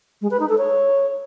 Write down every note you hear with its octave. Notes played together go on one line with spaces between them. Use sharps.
G#3
B4
D#4
A4
C#5